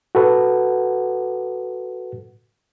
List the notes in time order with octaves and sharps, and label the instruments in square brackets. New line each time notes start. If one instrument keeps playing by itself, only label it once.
[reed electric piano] F#4 A4 B4 F#5